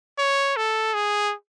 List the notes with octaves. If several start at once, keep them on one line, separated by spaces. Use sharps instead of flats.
C#5
A4
G#4